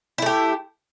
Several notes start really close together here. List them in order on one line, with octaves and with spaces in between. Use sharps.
E4 A3 G4